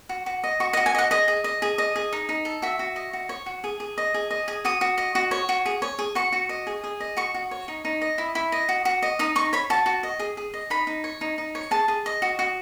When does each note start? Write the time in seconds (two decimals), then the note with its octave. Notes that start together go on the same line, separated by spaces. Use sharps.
0.09 F#4
0.26 F#4
0.44 D#5
0.60 F#4 C#6
0.73 D#5
0.77 F#4
0.86 G#5
0.95 D#5 F#5
1.11 G#4 D#5
1.28 G#4
1.44 D#5
1.62 G#4
1.78 D#5
1.96 G#4
2.13 D#4
2.29 D#4
2.45 A4
2.62 F#4 E5
2.79 F#4
2.96 D#5
3.13 F#4
3.29 C#5
3.46 F#4
3.64 G#4
3.80 G#4
3.98 D#5
4.14 G#4
4.31 D#5
4.48 G#4
4.65 F#4 D#6
4.81 F#4
4.98 D#5
5.15 F#4
5.31 C#5
5.49 F#4
5.66 G#4
5.82 C#5
5.99 G#4
6.15 F#4 C#6
6.32 F#4
6.49 D#5
6.67 G#4
6.84 G#4
7.00 D#5
7.17 F#4 C#6
7.34 F#4
7.51 C#5
7.68 D#4
7.85 D#4
8.02 D#5
8.18 E4
8.35 E4
8.52 D#5
8.69 F#4
8.85 F#4
9.03 D#5
9.19 D#4 D#6
9.36 D#4 C#6
9.53 C#5 B5
9.70 F#4 A5
9.86 F#4
10.03 D#5
10.19 G#4
10.37 G#4
10.54 D#5
10.70 D#4 B5
10.87 D#4
11.04 C#5
11.21 D#4
11.38 D#4
11.55 C#5
11.71 G#4 A5
11.88 G#4
12.06 D#5
12.22 F#4
12.39 F#4